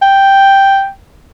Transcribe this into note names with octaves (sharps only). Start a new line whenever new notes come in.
G5